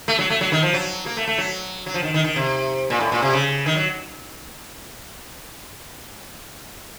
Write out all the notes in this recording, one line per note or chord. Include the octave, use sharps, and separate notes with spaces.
A3
F#3
A3
F#3
D#3
F3
F#3
A#3
A3
A3
F#3
F#3
F3
D#3
D#3
D#3
C3
A#2
A2
A#2
C3
C#3
D#3
F#3